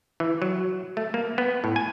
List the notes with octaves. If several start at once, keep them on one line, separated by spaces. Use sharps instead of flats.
E3
F#3
A3
A#3
B3
A2
G#5